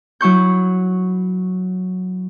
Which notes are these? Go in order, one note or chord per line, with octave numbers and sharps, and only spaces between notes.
F#3 E4 C#6 G6